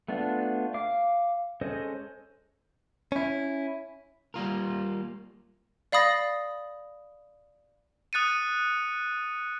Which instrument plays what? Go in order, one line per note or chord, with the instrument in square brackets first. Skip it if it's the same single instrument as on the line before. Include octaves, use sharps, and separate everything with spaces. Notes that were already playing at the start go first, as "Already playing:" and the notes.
[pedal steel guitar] A3 B3 D4 F4
F5 D6
G#3 C#4 A4 C5 D#5
[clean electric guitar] C#4 E4
G3 A#3 F4 A#4
[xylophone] D5 F5 B5 D#6 A6 A#6
[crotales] D#6 F#6 A6 C#7 D#7